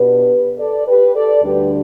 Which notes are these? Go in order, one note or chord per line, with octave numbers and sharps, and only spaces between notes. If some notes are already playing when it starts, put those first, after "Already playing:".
Already playing: B2 B3 D4 G4 B4
A4 D5
G4 B4
A4 D5
D2 D3 G3 D4 G4 B4